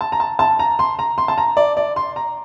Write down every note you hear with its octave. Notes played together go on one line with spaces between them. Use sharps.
A5
A#5
A5
A5
A#5
C6
A#5
C6
A5
A#5
D5
D5
C6
A#5